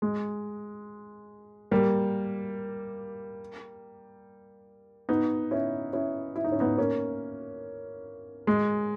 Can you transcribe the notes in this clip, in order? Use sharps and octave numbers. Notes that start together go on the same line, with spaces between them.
G#3
G3 A#3
B3 D#4
C#4 E4
C#4 E4
E4
D#4
C#4
B3 D#4
A#3 C#4
G#3